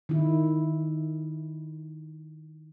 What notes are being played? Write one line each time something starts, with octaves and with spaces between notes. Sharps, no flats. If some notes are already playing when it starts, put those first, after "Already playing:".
D#3 E4